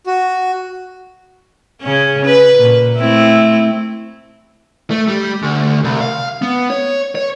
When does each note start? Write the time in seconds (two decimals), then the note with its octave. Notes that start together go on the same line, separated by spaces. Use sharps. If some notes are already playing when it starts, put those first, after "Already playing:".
0.07 F#4
1.82 C#3 C#4
2.25 B4
2.59 A#2
2.97 A3 C4 E4
4.91 A3
5.08 G3
5.43 D2
5.84 C2
6.01 F5
6.42 B3
6.70 C#5
7.15 C#5